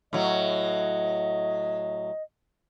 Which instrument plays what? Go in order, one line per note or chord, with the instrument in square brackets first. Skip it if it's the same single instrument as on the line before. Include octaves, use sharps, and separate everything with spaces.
[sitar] A2 F#3 [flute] D#5